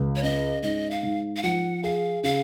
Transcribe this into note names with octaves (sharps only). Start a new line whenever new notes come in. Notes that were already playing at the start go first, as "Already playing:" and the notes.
Already playing: C#2
C#5
C#4 D#5
G#2 D#5
F5
G#2
F5
F3 F#5
G#4 F5
C#3 F5